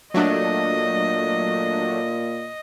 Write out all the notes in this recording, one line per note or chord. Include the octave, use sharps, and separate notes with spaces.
A#2 F#3 A3 D4 D#5